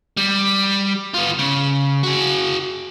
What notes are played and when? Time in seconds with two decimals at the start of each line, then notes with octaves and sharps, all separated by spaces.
0.17 G3
1.14 B3 F4
1.39 C#3
2.03 F#4 G#4